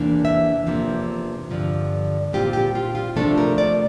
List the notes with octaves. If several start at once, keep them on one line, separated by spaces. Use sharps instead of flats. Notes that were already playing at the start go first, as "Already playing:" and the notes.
Already playing: E2 C3 E3 A#3 D4
E5
E2 C3 F3 A#3
G2 D3 F3
A#2 G3 C4 F4 G4
G4
F4
F4
C3 F3 A3 D4 A4
A#4
D5